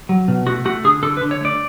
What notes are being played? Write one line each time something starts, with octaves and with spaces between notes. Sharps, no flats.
F#3
B2
A3 F#4
A3 F#4
D3 G#4
D3 A4
B4
D3
C#5
A3 D5